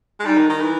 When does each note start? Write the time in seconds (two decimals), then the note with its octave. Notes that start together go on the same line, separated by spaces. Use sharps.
0.20 G#3
0.25 G3 D#4
0.38 D#3
0.50 D#3
0.62 E3